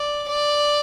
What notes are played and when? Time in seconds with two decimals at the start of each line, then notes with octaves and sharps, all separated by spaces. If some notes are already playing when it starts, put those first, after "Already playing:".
Already playing: D5
0.29 D5